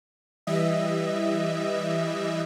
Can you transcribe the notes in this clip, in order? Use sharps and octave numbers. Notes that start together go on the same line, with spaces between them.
E3 G3 D#5 E5